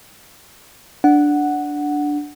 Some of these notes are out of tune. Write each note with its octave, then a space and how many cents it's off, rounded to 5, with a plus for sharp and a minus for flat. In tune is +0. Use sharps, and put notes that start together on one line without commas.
D4 +0 F#5 +0